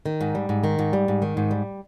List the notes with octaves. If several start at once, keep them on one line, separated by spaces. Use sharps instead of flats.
D#3
G#2
G3
G#2
D#3
G#2
G3
G#2
D#3
G#2
G3